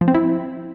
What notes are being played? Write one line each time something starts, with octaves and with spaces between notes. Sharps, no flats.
F3
C4
E4